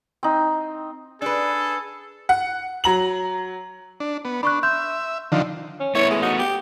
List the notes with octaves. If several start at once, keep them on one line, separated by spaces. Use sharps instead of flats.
C4 D#4
D4 G#4 A4 B4
F#5
F#3 A#5 F#7
D4
B3
D4 B5 C#6 F#6
E5 C6 G6
D3 D#3 F3
C#4
A3 B3 E4 C#5
G#3
D#4 F#4
G4